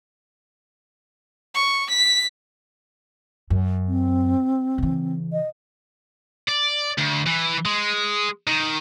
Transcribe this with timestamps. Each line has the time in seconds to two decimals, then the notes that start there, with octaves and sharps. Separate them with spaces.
1.54 C#6
1.89 B6
3.50 F#2
3.87 C4
4.78 C#3 E3
5.33 D#5
6.49 D5
6.98 D2
7.26 E3
7.66 G#3
8.47 D#3